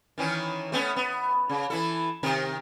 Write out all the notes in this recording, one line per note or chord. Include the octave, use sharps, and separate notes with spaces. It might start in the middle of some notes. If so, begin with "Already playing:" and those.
D#3 E3 C#4
A3 B3 C#4
B3
C#3
E3 E4 A4
C3 D#3 A#4